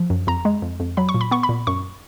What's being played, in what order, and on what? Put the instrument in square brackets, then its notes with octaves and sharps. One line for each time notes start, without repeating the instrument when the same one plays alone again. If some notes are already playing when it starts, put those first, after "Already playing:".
Already playing: [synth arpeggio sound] F3
F#2
F2 A#5
G#3
F2
F2
F#3 B5
C#6
A#2
B5
B3 C#6
B5
A#2
F#2 C#6